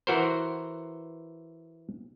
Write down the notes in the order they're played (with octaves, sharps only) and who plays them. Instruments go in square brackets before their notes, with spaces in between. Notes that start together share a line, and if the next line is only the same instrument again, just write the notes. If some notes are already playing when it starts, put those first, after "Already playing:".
[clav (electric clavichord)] E3 F#4 A#4 C5